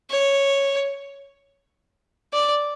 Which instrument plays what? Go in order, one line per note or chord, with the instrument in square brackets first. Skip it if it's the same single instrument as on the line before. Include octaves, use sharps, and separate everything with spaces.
[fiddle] C#5
D5